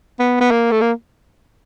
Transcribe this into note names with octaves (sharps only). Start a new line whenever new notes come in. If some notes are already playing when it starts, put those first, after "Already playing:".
B3
B3
A#3
A3
A#3